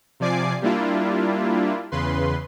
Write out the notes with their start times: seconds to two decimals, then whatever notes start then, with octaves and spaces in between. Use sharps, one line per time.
0.20 C3 F3 D5 G#5 D6 C7
0.62 G3 A#3 D4 E4 F4
1.91 E2 C#3 B4 C6